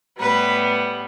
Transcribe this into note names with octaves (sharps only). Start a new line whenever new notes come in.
A2 G3 B3 B4